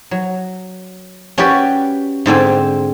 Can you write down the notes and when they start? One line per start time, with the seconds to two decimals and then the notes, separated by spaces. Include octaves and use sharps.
0.11 F#3
1.38 C#4 F#4 G4 B4 D5
2.26 G#2 D3 C4 G#5